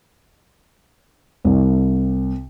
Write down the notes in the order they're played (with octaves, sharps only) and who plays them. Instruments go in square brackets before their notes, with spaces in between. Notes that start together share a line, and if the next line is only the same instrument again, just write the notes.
[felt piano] C2